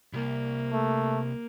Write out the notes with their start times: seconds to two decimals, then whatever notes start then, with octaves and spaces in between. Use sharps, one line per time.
0.13 C2 A#3
0.73 A3